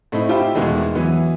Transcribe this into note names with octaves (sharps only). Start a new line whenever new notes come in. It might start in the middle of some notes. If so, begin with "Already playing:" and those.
A2 A3 C4 D#4 E4
F4 G4 C5 E5 G5 B5
E2 B2 D#3 E3 G#3 A3
E3 F#3 B3